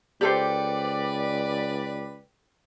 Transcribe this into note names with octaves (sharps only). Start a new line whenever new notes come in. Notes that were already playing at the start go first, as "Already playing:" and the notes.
C#2 G4 A4 B4 C5 D5 G5 D6